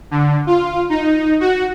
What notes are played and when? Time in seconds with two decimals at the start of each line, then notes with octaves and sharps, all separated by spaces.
0.11 D3
0.47 F4
0.90 D#4
1.40 F#4